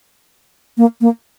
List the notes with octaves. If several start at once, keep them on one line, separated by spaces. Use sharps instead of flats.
A#3
A#3